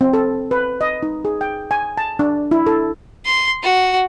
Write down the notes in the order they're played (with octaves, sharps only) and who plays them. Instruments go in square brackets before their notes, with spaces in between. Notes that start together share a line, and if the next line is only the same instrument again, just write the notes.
[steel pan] C4
A4
B4
D#5
D#4
G#4
G5
G#5
A5
D4
E4
A4
[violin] C6
F#4